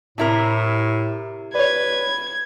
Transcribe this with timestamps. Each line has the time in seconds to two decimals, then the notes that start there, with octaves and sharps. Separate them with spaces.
0.18 A2 C3 E4 A#4
1.55 B4 C#5 D5 G#6